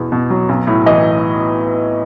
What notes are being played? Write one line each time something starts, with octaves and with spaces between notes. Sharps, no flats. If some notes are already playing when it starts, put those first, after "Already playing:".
Already playing: E2 B2
B2
F#3
B1
A2
E3 D#5